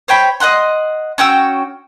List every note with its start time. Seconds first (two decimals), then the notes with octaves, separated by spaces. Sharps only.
0.08 C5 C#5 G5 B5
0.40 D#5 F5 F#5 C6
1.18 C#4 F#4 G5 E6